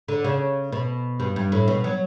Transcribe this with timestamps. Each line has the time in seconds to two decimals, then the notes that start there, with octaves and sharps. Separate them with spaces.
0.08 D3
0.24 C#3
0.72 B2
1.20 G2
1.36 G2
1.52 A2
1.68 B2
1.84 F#3